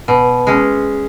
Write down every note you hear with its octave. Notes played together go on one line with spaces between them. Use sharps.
B2
G#3 C#4